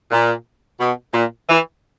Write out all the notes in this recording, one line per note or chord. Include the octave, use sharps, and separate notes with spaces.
A#2
B2
A#2
E3